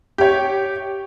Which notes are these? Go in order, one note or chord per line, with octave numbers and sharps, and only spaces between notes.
G4 C#5